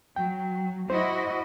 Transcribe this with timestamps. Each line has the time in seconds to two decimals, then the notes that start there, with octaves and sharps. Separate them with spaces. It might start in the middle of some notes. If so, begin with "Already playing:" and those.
0.16 F#3 G5
0.90 E4 F#4 C5 D#5